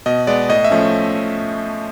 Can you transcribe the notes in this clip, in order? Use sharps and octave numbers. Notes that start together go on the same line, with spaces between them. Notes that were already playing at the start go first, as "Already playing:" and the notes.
B2 D#5
G#3 B3 D5
A2 D#5
E5
F3 A3 C#4